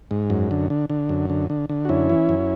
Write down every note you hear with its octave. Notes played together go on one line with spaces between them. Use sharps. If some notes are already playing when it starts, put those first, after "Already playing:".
G#2
F#2
D3
D3
D3
F#2
D3
D3
D3
F#4
F#2 C#4 E4
E3
F#2